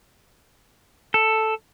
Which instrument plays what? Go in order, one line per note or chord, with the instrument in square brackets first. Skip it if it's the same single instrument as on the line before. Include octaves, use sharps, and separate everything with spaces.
[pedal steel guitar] A4